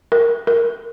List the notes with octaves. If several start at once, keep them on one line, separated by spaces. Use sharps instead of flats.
A#4
A#4